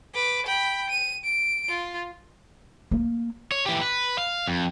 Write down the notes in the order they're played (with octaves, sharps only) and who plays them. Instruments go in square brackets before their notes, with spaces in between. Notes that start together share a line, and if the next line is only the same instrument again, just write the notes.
[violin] B4 D6
G5 B5
D#7
D7
F4
[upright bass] A#3
[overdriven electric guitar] C#5
E3 G4
B4
F5
F2